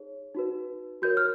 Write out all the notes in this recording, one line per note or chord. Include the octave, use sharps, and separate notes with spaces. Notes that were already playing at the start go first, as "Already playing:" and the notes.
Already playing: D#4 G#4 C#5
D#4 F#4 B4
F#4 A#4 C#5 G6
F6